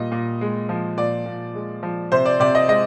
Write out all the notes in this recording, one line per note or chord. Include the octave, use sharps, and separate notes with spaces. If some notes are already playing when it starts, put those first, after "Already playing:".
Already playing: A#2 G3 D#5
A#2
G#3
F3
A#2 D5
A#2
G#3
F3
C3 C5
D5
C3 D5
D#5
G#3 D#5